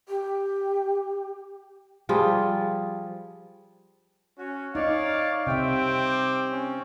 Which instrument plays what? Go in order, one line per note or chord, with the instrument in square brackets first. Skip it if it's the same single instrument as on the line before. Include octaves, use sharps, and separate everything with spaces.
[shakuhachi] G4
[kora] F3 G3 F4 G#4
[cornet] C#4 [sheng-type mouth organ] F#4
[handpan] D#4 [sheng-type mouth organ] C#5 D5 [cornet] F5
[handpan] C3 E5 [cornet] C4 [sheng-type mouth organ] G5
[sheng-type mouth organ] D6
C#4